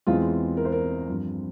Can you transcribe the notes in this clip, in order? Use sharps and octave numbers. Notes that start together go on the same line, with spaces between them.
E2 E3 G#3 C4 F4
A#4
C5
A#4
G2 F3 C4